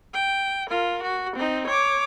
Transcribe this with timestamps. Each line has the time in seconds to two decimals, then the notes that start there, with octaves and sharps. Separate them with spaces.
0.14 G5
0.70 F4 A#4
1.03 F#4
1.36 C4 D#4
1.67 C#5 D6